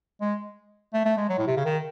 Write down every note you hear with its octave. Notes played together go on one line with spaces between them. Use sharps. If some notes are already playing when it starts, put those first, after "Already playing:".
G#3
A3
A3
G#3
F#3
A2
C3
C#3
D#3